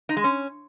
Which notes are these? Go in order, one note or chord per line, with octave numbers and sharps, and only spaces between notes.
D#4
G#3
C#4